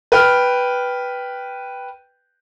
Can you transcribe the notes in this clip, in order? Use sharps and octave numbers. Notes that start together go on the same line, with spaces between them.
B4 G5 F6